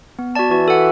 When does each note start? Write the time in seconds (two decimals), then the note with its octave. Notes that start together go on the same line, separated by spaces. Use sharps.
0.19 B3
0.35 F#4 D5 A5
0.51 E3 F#4
0.68 A4 F#5